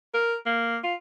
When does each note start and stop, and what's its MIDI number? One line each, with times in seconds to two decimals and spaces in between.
0.14 0.36 70
0.46 0.78 58
0.84 0.95 65